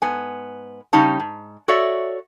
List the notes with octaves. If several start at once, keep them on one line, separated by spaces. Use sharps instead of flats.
G#2 B3 G#5
C#3 G3 C#4 D#4 A5
G#2
F#4 A4 C#5 D5 E5